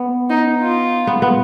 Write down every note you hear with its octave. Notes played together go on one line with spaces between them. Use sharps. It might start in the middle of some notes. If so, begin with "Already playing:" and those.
Already playing: B3
D#4
F4
B3
B3